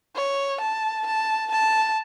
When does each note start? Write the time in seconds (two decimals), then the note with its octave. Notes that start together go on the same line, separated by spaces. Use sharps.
0.15 C#5
0.61 A5
1.06 A5
1.51 A5